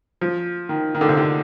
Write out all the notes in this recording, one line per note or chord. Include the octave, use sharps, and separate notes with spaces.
F3
D#3
D#3
D3
C3
D3